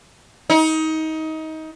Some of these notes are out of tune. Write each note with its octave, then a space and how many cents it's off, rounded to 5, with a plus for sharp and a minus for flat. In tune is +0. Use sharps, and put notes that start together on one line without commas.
D#4 +25